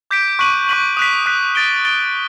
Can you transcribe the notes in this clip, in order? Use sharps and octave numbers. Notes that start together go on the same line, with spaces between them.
D6 G6 B6 D7
C#6 F#6 B6 D#7 F#7
C#6 F#6 B6 D#7 F#7
D#6 F#6 B6
D#6 F#6 B6
A6 D7 G7
A6 D7 G7